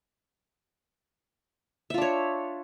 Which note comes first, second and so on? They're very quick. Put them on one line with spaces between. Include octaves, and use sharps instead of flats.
E5 F4 D4 C#5